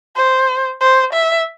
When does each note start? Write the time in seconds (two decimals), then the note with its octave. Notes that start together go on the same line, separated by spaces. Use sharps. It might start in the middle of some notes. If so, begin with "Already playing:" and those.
0.16 C5
0.81 C5
1.13 E5